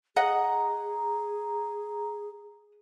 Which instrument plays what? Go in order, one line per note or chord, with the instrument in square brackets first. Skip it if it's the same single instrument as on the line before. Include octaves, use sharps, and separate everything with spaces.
[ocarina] G#4 [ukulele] D#5 F#5 [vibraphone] A#5